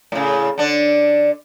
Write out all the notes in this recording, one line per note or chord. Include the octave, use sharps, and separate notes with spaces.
A2 C#3
D3 D4